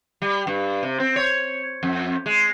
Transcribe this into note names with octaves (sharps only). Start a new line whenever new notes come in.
G3
G2
C3
C4
C#5
F2
G#3